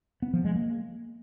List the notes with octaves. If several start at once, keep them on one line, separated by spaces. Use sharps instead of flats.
B3
F3
G#3
A#3